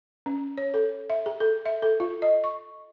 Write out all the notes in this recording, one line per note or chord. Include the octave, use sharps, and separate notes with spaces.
C#4
C#5
A4
E5
G#4
A4
E5
A4
F4
D#5
C#6